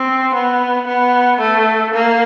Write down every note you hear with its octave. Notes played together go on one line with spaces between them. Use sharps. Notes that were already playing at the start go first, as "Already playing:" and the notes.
Already playing: C4
B3
B3
A3
A#3